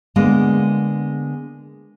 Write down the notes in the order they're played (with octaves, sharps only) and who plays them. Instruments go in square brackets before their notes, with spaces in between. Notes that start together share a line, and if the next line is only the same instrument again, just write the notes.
[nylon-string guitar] D3 G#3 A#3 B3